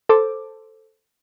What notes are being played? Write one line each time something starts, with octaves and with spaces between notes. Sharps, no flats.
A4 C5 D6